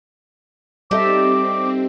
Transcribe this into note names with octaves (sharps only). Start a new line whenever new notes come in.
G3 C4 D#4 G4 A4 E5 D6